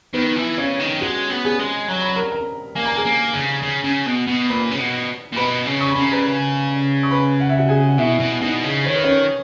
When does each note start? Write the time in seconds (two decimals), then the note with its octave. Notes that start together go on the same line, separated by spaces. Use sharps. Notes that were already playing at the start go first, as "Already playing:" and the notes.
0.13 D#3 B3 B4
0.36 E3
0.58 C#3 C#4 C#5
0.79 D#3
1.01 G#3 F#4 F#5
1.30 B3
1.45 G#4 G#5
1.59 G#3
1.88 F#3 A#5
2.02 B5
2.16 A#4 A#5
2.32 A#4 A#5
2.75 A#3 G#5
2.86 A#5
2.96 G#4 G#5
3.05 A#3
3.34 C#3
3.62 C#3
3.84 C#3
4.07 B2
4.27 B2
4.49 A#2 B4 B5
4.71 C#3
4.79 B2
5.32 A#2
5.36 B2 B4 B5
5.66 C#3
5.81 C#6
5.91 C#3 B5
6.01 A#5
6.12 B4 B5
7.03 C#6
7.11 B4 B5
7.40 F#5
7.49 E5
7.58 F#4 F#5
7.69 G#4 G#5
7.88 F#5
7.98 B2 E4 E5
8.20 B2
8.41 B2 D#4 D#5
8.64 C#3
8.85 D#3 C#5
8.95 B4
9.04 C#4 C#5